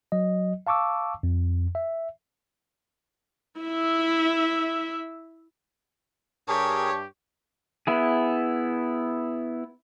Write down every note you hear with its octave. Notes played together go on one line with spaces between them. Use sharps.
F#3 D#5
F5 A5 C#6 D6 E6
F2
E5
E4 E5
G2 G4 G#4 A#4 C#5 A5
B3 E4 G#4